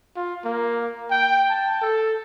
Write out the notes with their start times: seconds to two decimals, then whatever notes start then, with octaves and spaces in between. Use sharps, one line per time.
0.16 F4
0.45 A#3
1.11 G5
1.50 A5
1.82 A4